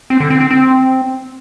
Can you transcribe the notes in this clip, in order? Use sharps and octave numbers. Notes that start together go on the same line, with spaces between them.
C4
D3
C4
C4
C4